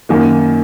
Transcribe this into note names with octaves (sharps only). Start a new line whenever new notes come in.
F#2 D#3 A#3